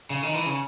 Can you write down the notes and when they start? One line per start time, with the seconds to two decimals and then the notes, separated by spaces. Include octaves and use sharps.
0.10 C#3
0.23 D#3
0.34 E3
0.46 C#3